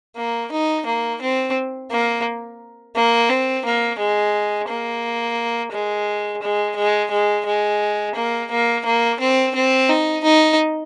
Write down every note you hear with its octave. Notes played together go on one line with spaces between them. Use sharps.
A#3
D#4
A#3
C4
A#3
A#3
C4
A#3
G#3
A#3
G#3
G#3
G#3
G#3
G#3
A#3
A#3
A#3
C4
C4
D#4
D#4